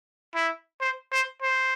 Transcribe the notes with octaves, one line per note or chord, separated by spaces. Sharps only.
E4
C5
C5
C5